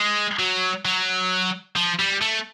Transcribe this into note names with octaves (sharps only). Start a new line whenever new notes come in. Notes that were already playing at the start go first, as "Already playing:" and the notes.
Already playing: G#3
F#3
F#3
F3
G3
A3